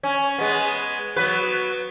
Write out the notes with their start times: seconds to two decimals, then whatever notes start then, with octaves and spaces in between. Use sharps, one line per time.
0.03 C#4
0.38 G#3 B3
1.16 F#3 B3 B4